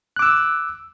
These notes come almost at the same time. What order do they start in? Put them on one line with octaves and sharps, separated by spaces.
F#6 D6 E6